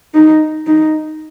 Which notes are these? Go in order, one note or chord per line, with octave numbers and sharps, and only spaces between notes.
D#4
D#4